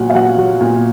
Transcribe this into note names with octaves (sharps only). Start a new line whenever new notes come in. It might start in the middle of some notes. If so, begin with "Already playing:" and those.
Already playing: A#2 F#3 F#5
F5
F#3 F#5
F#3
A#2